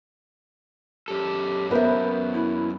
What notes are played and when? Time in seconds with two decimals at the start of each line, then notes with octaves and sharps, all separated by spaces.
1.08 F#2 G4 A4
1.71 B3 A#4 C5 E5
2.33 E4